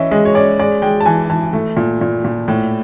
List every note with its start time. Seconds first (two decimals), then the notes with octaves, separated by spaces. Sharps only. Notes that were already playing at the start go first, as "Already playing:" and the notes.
Already playing: E3 C#4 D#5 E5
0.11 G#3 D#5
0.25 C#5
0.35 C#4 D5
0.59 G#3 D5
0.82 G#3 G5
1.00 A5
1.06 E3 G#5
1.30 E3 A5
1.53 A3
1.77 A#2
2.01 A#2
2.24 A#2
2.48 A2